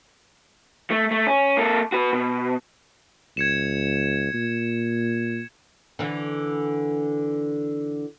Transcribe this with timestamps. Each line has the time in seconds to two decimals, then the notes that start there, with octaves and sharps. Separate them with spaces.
0.91 A3
1.11 A3
1.27 C#4
1.57 A#3 A4
1.92 F#4 B4
2.13 B2
3.37 C#2 G#6 C#7 E7
4.34 A#2
5.99 D3 E3